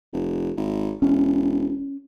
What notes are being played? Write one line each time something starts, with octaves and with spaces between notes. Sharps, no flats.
F1
G#1
E1 C#4